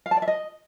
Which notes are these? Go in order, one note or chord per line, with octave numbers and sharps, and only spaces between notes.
F5
A5
D5
E5
D#5